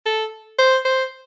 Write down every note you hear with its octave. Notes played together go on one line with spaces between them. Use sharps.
A4
C5
C5